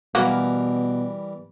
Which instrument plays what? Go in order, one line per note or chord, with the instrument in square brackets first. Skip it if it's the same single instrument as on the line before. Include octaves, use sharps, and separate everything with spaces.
[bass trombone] B2 [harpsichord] E3 G3 A#4 [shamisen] A#3 F#4